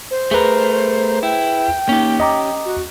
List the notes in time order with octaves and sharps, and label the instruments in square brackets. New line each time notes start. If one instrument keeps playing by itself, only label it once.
[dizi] C5
[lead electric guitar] A3 A#4 [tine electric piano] G#4 B4
[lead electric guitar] E4 [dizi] G5
[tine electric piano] A#3 D#4 [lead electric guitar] C#4 G4
[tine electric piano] D#5 A#5 D6
[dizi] F#4